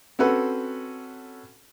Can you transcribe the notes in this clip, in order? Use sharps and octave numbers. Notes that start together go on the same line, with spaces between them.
C4 C#4 F#4 A4 B4